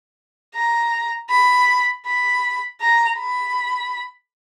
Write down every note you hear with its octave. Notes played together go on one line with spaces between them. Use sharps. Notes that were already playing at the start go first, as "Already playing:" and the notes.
A#5
B5
B5
A#5
B5